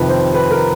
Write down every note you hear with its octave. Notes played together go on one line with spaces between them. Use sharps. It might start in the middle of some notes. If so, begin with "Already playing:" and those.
Already playing: F2 C3 D#3 B4
C5
B4
A#4